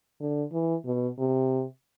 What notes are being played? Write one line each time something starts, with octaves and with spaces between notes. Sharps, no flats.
D3
E3
B2
C3